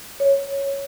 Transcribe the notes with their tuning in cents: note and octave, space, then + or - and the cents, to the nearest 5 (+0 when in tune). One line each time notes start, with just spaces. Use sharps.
C#5 +0